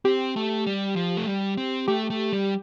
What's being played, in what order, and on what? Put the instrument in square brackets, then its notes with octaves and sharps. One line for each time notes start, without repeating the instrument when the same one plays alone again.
[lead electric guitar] C4 [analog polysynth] G4
[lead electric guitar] A3
G3
F3
A3
G3
C4
[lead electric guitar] A3 [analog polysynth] G4
[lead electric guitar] A3
G3